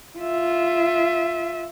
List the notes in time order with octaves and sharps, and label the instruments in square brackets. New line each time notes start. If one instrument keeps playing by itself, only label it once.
[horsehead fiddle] F4 E5